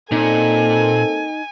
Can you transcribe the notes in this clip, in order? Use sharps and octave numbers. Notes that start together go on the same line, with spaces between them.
A#2 A#3 C4 D#4 A4 G#5